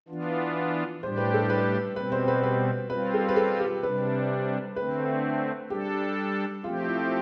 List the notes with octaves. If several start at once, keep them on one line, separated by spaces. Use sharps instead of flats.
E3 B3 D4 F4
A2 G3 D4 G4 C5
B4
A4
B4
B2 G3 C4 B4
C5
B4
B4
G3 C4 F4 B4
A4
B4
A4
G4
C3 G3 D4 B4
D3 A3 C4 B4
G3 D4 G4 A4
F3 A3 C4 F4 G4
E4